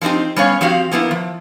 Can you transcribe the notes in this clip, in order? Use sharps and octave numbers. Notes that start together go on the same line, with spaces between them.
F3 F#3 C4 D#4 G4
G3 B3 C#4 C#5 F5
F3 C4 F#4 G4 F5
F3 A#3 B3 E4
F3